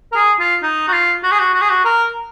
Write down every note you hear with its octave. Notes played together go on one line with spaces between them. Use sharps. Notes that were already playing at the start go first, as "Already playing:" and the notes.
A#4
G#4
F4
D#4
F#4
F4
F#4
G#4
F#4
F#4
G#4
F#4
A#4